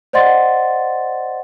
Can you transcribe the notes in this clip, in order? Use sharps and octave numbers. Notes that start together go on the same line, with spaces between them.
C5 D5 D#5 F#5 C6 A6